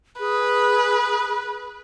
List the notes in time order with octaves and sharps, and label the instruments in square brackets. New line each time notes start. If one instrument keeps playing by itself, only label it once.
[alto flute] G#4 [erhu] B4